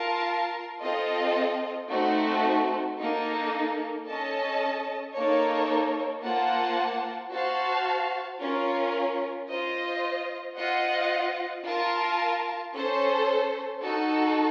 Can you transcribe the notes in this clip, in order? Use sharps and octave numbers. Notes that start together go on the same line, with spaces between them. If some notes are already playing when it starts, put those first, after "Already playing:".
Already playing: F4 A#4 F5 A5
C4 F4 A4 D#5
A3 C4 D#4 F#4 C5
A#3 D#4 A4
C#4 A4 D#5 A5
A#3 D#4 A4 C#5
A#3 F4 C5 F#5 A5
F#4 C5 F5 A5
C#4 F4 A#4
F4 C5 D#5
F4 C5 D#5 F#5
F4 A#4 F5 A5
C#4 A4 C5
D#4 F#4 A4